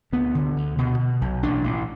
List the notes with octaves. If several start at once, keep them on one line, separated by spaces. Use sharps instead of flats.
D2 B3
D3
D2
B2
B2
B1
A1 D4
A1